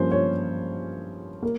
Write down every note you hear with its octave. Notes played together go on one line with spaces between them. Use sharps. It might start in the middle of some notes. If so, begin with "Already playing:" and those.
Already playing: G2 F3 A#3 C#4 C5
C#5
A#3